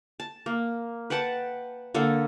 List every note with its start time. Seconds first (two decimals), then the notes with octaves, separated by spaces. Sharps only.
0.20 A5
0.46 A#3
1.10 B4 F#5 G5 A5
1.94 D3 A#3 A4